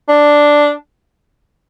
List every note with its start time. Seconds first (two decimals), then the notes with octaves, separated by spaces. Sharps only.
0.09 D4